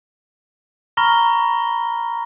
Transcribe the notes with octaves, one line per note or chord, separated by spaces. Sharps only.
A#5 B5 C#6 F6 A#6 G7